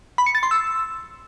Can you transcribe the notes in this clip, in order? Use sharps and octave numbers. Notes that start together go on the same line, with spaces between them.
B5
C#7
A6
C6
E6